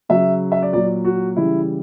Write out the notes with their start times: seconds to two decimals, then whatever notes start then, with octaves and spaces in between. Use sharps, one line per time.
0.09 C#3 F#3 E5
0.52 E5
0.62 D5
0.73 A#2 F#3 D5
1.04 F#4
1.37 C#3 E3 G3 E4